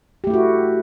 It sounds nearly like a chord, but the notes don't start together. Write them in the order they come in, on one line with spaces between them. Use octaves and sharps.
G4 A3 E4 F#4